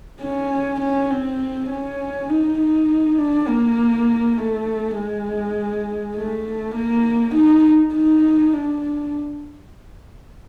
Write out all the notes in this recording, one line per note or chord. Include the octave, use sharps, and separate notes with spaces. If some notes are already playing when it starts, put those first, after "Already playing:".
C#4
C#4
C4
C#4
D#4
D#4
D4
A#3
A3
G#3
A3
A#3
D#4
D#4
D4